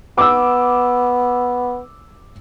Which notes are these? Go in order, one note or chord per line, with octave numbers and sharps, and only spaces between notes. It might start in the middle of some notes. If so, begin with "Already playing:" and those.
B3 D6 E6